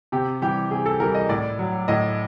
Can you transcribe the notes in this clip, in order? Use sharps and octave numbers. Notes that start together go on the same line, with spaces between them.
C3 G4
E3 G3 G4
C3 G#4
A4
E3 G3 A#4
D#5
A2 D5
F#3
A2 D#5